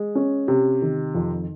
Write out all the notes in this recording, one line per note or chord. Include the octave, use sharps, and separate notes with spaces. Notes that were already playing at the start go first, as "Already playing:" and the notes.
Already playing: G#3
C#4
C3
D#3
F2